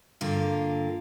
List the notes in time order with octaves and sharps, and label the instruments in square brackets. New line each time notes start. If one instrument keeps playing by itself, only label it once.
[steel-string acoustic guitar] G2 D3 A#3 F4